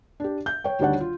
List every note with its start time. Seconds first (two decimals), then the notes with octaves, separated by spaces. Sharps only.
0.20 D4 G4
0.46 G6
0.64 C#5 G5
0.79 D2 D#3 G3 D4 C#5 F#5
1.00 F4